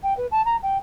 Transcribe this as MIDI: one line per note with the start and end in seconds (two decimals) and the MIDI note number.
0.03 0.16 79
0.17 0.26 71
0.31 0.44 81
0.45 0.57 82
0.63 0.78 79